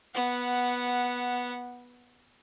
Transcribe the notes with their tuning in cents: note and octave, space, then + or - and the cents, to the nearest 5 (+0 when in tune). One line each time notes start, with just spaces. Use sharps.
B3 -10 F#5 +0